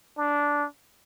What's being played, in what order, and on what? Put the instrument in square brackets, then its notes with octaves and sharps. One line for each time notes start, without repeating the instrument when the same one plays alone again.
[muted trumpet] D4